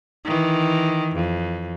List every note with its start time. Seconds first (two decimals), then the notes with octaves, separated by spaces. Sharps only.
0.25 D#3 E3
1.16 F2